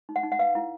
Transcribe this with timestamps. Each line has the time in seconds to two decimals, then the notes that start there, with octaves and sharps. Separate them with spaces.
0.09 D#4
0.16 F#5
0.23 D#4
0.32 F#5
0.39 B4 F5
0.55 E4